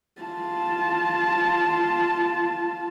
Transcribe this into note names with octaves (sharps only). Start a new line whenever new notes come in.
F4 A5